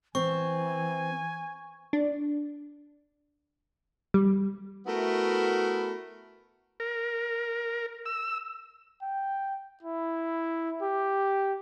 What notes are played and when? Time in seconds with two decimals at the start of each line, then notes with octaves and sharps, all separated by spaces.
0.15 E3 C4 G#5 C#6
1.93 D4
4.14 G3
4.86 A3 B3 E4 F#4 A#4
6.80 A#4
8.06 E6
9.02 G5
9.83 E4
10.82 G4